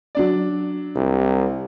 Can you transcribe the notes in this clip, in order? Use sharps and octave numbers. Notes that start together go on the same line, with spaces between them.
F#3 D4 D5
C2